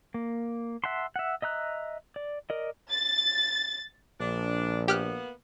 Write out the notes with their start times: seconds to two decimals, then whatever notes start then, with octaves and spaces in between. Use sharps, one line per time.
0.14 A#3
0.84 E5 F#5 A5 C6
1.16 E5 F#5
1.42 D#5 E5 A#5 F#6
2.16 D5
2.50 A#4 D5 D#5
2.91 A6
4.20 A#1 D4
4.88 A#3 B3 G4 F6 F#6